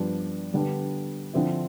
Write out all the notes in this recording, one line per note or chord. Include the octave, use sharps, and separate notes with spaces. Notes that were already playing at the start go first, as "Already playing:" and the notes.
Already playing: G2 F3 B3 D4
D3 G3 B3 D4
D3 F3 C4 E4